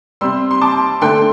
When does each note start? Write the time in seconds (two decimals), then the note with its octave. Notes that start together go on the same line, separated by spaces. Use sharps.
0.21 C3 G3 C6 E6
0.51 C6
0.61 A5 D6
1.01 D3 A3 G5 C6